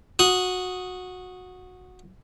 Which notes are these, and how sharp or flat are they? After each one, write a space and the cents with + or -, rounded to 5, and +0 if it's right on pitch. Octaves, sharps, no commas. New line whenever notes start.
F#4 -15 D#6 +0